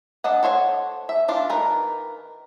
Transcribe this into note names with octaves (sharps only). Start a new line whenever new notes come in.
D4 A4 D#5 F#5
A4 C5 C#5 E5 F#5
E5
E3 D4 F4
D#3 A#4 B4